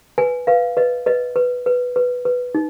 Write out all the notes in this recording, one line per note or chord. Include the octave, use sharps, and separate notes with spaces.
B4 G#5
B4 F5
B4 D#5
B4 D#5
B4
B4
B4
B4
D#4